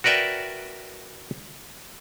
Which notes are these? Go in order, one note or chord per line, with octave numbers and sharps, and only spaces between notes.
F#4 A#4 B4 D5 E5 G5